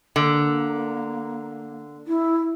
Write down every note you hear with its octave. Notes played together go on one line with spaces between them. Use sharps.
D3 A#3
E4